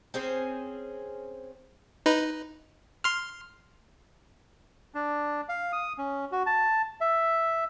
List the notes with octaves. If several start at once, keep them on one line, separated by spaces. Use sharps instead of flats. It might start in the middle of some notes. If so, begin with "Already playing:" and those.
C4 C#4 G#4 C5
D#4 B4
C6 F6
D4
F5
D#6
C#4
F#4
A5
E5